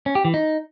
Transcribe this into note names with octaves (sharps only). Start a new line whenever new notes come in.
C#4
G4
E3
D#4